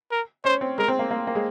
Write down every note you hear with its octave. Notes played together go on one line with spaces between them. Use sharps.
A#4
C#4 C5
C4
G#3 A#4
C4
A#3
A#3
A#3
G#3